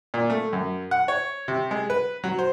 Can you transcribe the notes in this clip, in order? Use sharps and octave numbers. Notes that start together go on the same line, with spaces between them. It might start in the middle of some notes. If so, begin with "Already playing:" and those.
A#2
A3
F#2
F#5
C#5
C3
G#3
B4
F#3
C5